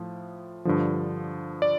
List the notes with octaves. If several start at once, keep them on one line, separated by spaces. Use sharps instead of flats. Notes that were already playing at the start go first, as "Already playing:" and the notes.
Already playing: A2 F3
G2 D3 F3
D5